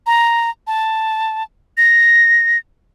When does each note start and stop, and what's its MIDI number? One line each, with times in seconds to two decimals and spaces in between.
0.06 0.50 82
0.67 1.43 81
1.77 2.58 94